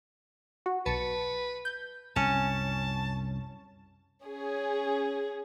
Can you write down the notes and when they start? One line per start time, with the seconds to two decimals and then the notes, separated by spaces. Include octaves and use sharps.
0.66 F#4
0.86 B1 B4 A5 C#7
1.65 G6
2.16 C2 F#2 C#4 A5
4.25 C#4 G#4